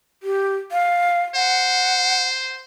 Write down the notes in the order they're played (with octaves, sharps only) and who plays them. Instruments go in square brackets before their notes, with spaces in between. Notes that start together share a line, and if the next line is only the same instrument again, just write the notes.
[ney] G4
F5
[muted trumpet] C5 [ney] F#5